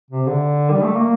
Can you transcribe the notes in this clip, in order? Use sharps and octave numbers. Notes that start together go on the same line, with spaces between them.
C3
D3
G3
A3
A#3